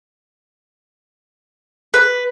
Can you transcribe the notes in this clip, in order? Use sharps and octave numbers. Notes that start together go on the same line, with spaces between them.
B4